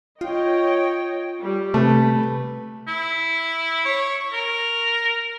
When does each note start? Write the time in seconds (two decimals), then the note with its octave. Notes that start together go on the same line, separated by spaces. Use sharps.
0.21 F4 C#5 D#5 G5
1.39 G3
1.74 C3 A3 B4
2.88 E4
3.85 C#5
4.33 A#4